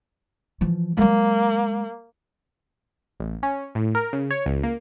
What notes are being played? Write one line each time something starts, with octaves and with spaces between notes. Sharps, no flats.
E3 F3
F#3 G#3 A#3
A1
C#4
A2
A#4
C#3
C#5
C#2
A#3